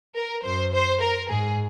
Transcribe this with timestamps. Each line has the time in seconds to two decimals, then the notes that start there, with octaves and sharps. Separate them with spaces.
0.16 A#4
0.43 F#2 C5
0.73 C5
1.01 A#4
1.29 G#2 G#4